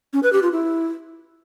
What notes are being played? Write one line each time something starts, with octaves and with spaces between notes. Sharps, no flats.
C#4
B4
G4
F4
E4